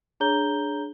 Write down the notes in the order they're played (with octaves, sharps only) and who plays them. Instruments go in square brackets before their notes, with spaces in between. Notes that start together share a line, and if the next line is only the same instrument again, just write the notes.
[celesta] D4 G#4 C#5 A#5 G6 G7